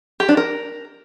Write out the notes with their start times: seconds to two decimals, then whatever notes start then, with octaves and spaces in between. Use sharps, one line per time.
0.20 G4
0.29 D4
0.37 A#4